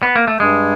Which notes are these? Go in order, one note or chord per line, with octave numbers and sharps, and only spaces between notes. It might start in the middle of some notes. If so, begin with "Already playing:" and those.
B3
A#3
A3
G2 G#3